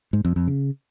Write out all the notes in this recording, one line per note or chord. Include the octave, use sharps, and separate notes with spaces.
G#2
F2
F2
C#3